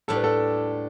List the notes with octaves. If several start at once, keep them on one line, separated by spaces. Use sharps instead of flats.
A2 G3 D4 A4
B4
A4